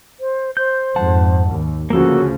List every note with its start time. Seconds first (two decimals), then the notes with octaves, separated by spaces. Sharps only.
0.20 C5
0.57 C5 G6
0.96 F2 G#2 F#5 A5
1.48 D#2
1.90 D2 C#3 F3 A#3 F#4 A4